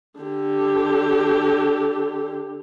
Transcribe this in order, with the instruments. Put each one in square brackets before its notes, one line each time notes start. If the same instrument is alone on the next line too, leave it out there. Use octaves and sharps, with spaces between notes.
[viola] D3 G4